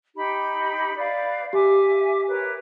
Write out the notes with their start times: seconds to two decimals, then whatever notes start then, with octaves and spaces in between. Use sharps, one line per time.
0.15 D#4 G4 B5
0.96 B4 D5 F5
1.53 G4 E5 G#5 D6
2.28 A#4 B4 C#5